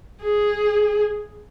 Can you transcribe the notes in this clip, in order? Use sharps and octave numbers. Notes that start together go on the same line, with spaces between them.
G#4